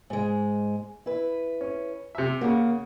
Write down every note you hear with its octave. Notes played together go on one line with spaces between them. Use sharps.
G#2 G#3
E4 B4
C#4
C3 E5
C#3 A#3 F#4